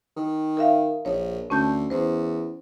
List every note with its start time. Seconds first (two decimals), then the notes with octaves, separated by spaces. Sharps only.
0.16 D#3
0.57 A#4 E5 F5
1.05 A#1 C#5
1.50 D2 C#4 A5 G6
1.90 E2 C5